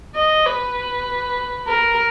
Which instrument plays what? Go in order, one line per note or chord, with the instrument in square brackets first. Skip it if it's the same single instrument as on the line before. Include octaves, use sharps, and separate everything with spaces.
[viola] D#5
B4
A#4